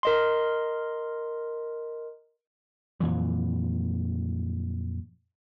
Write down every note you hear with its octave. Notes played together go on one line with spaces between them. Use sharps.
A#4 D#5 C6
F2 A#2 E3 F#3